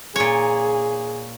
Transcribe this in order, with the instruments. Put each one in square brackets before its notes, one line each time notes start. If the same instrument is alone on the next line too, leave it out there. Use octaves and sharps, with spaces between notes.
[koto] A#2 C#5 [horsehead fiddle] G#4